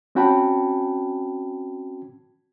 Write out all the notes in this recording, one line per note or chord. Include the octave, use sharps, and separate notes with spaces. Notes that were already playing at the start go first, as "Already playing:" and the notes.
C4 C#4 F#4 G5 A5 B5